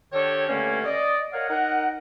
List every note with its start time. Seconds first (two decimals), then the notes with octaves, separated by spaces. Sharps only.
0.12 D3 D#3 D4 G4 A4 C#5
0.48 G2 D3 A3 A#3 C#4
0.84 D5 D#5
1.33 A#4 C#5 D#5 F5 F#5
1.48 D#4 A#4 F#5